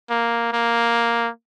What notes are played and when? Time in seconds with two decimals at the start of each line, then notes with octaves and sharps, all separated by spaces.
0.10 A#3
0.53 A#3